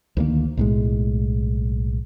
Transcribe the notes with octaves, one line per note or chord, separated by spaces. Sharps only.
D2 D#3 A#3
B1 A2 G#3